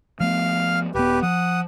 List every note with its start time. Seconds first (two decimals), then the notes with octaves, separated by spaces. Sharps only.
0.20 F3 A3 B3 F5 F6
0.95 D#1 B3 G4 B4
1.23 F3 F#5 D#6